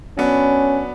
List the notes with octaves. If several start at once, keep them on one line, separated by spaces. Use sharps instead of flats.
F#3 B3 C#4 D4